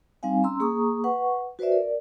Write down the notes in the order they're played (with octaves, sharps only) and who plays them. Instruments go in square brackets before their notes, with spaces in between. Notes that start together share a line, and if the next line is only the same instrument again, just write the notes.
[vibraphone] G3 C4 D#4 F5 G#5
C#4 A#5 C6 E6
A#3 G#4 A#5 C#6 D#6
B4 F#5 C#6
F#4 B4 C5 D5 E5
A#4 D5